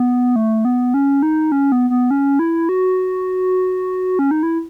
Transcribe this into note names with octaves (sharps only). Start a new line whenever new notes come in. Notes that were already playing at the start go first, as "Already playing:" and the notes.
Already playing: B3
A3
B3
C#4
D#4
C#4
B3
B3
C#4
E4
F#4
C#4
D#4
E4